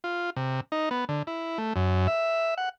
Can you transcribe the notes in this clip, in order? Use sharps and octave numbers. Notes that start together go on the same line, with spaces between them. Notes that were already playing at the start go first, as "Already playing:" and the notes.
F4
C3
D#4
B3
D3
E4
A3
F#2
E5
F#5